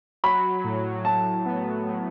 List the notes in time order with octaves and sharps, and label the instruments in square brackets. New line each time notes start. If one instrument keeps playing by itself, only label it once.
[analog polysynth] F#3 [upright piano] B5
[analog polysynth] A2
[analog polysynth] F#3 [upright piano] A5
[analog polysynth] B3
A2